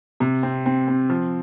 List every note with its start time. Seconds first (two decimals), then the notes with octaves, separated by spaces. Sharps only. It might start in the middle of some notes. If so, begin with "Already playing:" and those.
0.20 C3
0.43 C4
0.66 C4
0.88 C4
1.09 F3